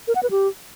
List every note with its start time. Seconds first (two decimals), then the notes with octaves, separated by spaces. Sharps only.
0.08 A#4
0.15 F#5
0.23 B4
0.31 G4